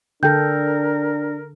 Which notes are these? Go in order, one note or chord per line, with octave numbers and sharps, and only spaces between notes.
D3 D4 A4 A#4 G5 G6